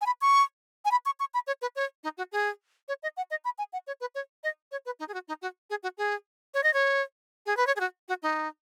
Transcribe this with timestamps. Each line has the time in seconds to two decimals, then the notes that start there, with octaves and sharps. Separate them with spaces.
0.01 G#5
0.06 B5
0.21 C#6
0.85 G#5
0.91 B5
1.06 C#6
1.20 C#6
1.34 B5
1.47 C#5
1.62 B4
1.76 C#5
2.04 D#4
2.18 F#4
2.32 G#4
2.88 C#5
3.03 D#5
3.17 F#5
3.31 D#5
3.45 B5
3.58 G#5
3.73 F#5
3.87 C#5
4.01 B4
4.15 C#5
4.44 D#5
4.72 C#5
4.86 B4
4.99 D#4
5.08 G#4
5.14 F#4
5.28 D#4
5.42 F#4
5.70 G#4
5.83 F#4
5.98 G#4
6.54 C#5
6.63 D#5
6.74 C#5
7.46 G#4
7.57 B4
7.67 C#5
7.76 G#4
7.80 F#4
8.09 F#4
8.23 D#4